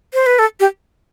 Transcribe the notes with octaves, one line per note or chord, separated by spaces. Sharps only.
C5
B4
A4
G4